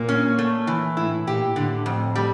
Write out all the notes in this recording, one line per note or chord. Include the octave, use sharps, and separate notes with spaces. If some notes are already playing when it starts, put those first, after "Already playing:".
Already playing: A#2 A#3
C#4
A3
E3
A2 E4
A#2 G4
A2 D3
F2
G3